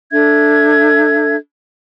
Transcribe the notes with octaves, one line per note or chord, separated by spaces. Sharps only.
D4 A4 E5 G#6